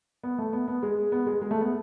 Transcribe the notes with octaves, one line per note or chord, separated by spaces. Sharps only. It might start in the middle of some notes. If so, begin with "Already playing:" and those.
B3
A3
B3
B3
G#3
B3
G#3
G#3
A3
B3